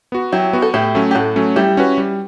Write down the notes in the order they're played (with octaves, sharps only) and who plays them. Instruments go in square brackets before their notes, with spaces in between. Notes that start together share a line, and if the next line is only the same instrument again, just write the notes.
[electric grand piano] B3 F#4
[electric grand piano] F#3 [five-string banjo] E4 G4
[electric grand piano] B3 F#4
[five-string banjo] A4
[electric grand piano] A2 [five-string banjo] E4 G4
[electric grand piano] F#3 A3 C#4
[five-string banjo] G4
[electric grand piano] A2 [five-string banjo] F#4 A4
[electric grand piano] F#3 A3 C#4
[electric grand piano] G3 [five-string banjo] E4 G4
[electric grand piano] C#4 F#4 B4
G3